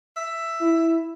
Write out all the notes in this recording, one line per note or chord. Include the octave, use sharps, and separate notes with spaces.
E5
E4